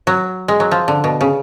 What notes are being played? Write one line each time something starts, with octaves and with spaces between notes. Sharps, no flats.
F#3
G#3
F#3
F3
D3
B2
C#3